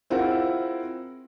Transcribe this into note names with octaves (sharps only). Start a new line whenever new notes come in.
C4 E4 F4 G#4 A#4 F#5